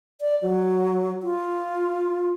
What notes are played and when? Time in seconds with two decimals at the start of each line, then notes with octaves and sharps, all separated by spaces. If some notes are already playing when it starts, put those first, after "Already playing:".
0.21 D5
0.42 F#3
1.23 F4